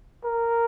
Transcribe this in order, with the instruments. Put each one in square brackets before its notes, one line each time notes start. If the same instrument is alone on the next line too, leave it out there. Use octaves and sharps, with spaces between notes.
[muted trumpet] A#4